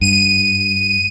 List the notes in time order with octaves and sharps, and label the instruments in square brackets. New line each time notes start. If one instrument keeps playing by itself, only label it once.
[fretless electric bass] G2 [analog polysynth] D#7